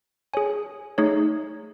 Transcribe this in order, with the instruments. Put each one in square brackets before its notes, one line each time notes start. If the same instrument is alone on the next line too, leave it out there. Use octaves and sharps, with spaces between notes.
[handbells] G#4 C#5 G#5
A3 D#4 G#4 C#5